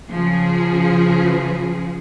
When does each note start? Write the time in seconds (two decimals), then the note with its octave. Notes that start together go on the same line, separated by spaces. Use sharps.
0.11 C#3 F3 G#4